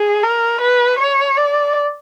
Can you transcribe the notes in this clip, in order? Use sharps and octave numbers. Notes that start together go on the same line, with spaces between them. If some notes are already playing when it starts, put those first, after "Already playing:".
Already playing: G#4
A#4
B4
C#5
D5